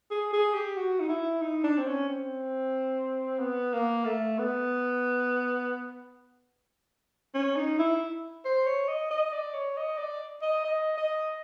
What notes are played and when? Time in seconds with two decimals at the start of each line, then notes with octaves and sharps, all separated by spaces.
0.11 G#4
0.33 G#4
0.54 G4
0.77 F#4
1.00 D#4
1.09 E4
1.42 D#4
1.64 D4
1.78 C4
1.87 C#4
2.08 C4
3.39 B3
3.73 A#3
4.05 A3
4.39 B3
7.34 C#4
7.56 D#4
7.79 E4
8.45 C5
8.66 C#5
8.88 D#5
9.11 D#5
9.33 D5
9.54 C#5
9.77 D#5
9.98 D5
10.42 D#5
10.64 D#5
10.98 D#5